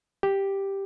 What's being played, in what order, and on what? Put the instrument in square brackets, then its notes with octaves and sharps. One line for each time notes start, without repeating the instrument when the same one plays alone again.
[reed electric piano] G4